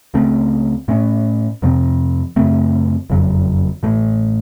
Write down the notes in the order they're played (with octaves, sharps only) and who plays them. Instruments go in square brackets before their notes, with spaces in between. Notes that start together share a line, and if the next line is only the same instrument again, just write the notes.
[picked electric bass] C#2 C#3 A3 C4
A2 A3 C#4
F2 C3 F3 C4
F#2 C#3 A3 C4
F#1 F2 C#3 F#3
A1 A2 A3